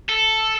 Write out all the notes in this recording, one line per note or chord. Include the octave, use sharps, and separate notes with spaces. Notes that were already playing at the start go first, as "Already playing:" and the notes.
A4